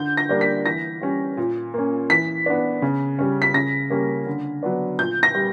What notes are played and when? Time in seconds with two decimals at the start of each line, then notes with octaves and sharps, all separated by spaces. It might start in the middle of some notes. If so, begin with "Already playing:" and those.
Already playing: D3 G6
0.17 A#6
0.29 G3 A#3 D4
0.41 B6
0.66 E3 A#6
1.01 G3 C#4
1.37 A#2
1.74 A#3 C#4
2.10 E3 B6
2.46 B3 D4
2.82 C#3
3.19 G3 C#4
3.42 B6
3.54 C#3 A#6
3.90 G3 A#3 C#4
4.26 D3
4.63 F#3 B3 D4
4.99 A#2 G6
5.23 A#6
5.35 G3